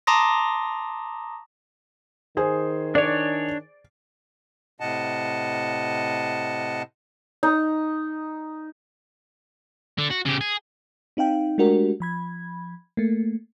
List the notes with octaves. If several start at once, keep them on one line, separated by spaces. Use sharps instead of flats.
A5 A#5 C6 D6 D#6 A#6
D#3 G#4 C5 G#5
D4 C#5 D5
A2 C3 D#5 F#5 A5
D#4
D3
F#4
C#3 G4
G#4
C4 D#4 F5 G5
G#3 A3 D4 F#4 G4 A#4
F3 B5 G#6
A3 A#3